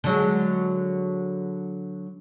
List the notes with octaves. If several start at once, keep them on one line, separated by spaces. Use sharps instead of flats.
D3 F#3 G#3